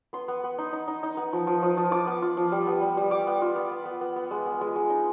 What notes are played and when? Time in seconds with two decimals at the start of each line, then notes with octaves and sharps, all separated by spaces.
0.13 B3 C6
0.28 B3
0.44 B3
0.58 D#4
0.73 D#4
0.88 D#4
1.03 D#4
1.17 B3
1.33 F3
1.47 F3
1.62 F3
1.77 F3
1.92 F4 D6
2.07 B3
2.22 F4
2.37 F3
2.52 G3
2.67 B3
2.82 G3
2.97 G3
3.11 G3 D6
3.27 B3
3.42 F4
3.56 B3
3.71 B3
3.85 B3
4.01 B3
4.16 B3
4.31 G#3
4.46 B3
4.61 G#3
4.76 G#3
4.90 D#4